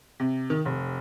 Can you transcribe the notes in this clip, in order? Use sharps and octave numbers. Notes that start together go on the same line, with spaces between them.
C3
D#3
F1